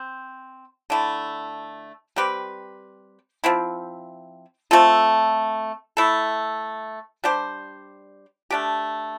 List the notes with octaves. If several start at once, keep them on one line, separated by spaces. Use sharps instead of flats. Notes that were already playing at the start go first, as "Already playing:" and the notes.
Already playing: C4
D3 A3 E4
G3 C4 G4 B4
F3 C4 E4
A3 C4 F4 A4
A3 E4 A4
G3 D4 G4 C5
A3 D4 G4